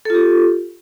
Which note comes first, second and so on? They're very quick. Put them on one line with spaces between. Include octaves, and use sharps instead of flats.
A4 F4 G4